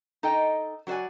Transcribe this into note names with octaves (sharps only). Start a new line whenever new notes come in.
D#4 A4 D#5 G5
F#3 F#4 B4 D5 G#5